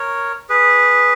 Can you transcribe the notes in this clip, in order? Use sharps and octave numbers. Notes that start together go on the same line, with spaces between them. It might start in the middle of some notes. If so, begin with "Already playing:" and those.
Already playing: A#4 C#5
G#4 B4